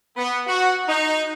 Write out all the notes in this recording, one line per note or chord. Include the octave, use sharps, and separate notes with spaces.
B3
F#4
D#4